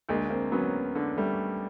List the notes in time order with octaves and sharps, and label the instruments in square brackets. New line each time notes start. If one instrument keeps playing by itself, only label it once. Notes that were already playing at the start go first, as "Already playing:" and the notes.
[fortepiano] D2 [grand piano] G#3 A#3
[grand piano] A#3 C4
[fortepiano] F#3 [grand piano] B3 C#4
[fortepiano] D3
[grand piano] G3 A3